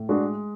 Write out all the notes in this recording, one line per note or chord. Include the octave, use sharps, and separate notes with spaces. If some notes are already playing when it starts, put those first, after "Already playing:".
Already playing: A2
G#3 D4 F#4